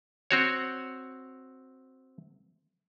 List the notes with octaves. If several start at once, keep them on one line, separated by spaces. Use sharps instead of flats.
C4 F#4 C#5